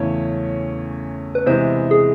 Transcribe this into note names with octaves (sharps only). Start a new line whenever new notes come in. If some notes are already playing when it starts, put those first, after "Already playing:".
Already playing: E2 C#3 E3 A3 C#4 C#5
B4
C3 E3 G#3 B3 C5
G#4